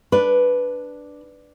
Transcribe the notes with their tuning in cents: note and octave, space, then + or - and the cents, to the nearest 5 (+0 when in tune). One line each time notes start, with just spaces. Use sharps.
D4 +0 B4 +0